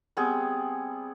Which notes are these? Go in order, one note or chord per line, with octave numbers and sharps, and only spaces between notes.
G3 B3 C4 G#4